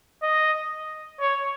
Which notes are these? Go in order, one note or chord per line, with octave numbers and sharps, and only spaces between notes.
D#5
C#5